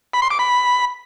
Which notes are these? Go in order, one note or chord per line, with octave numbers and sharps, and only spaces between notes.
B5
C6
D6
B5